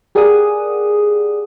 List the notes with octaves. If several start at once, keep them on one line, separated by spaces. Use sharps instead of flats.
G4 G#4 A#4 D5 F#5 D#6